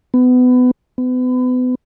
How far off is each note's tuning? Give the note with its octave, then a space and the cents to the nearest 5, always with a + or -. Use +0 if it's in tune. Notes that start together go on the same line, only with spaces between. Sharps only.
B3 +25
B3 +35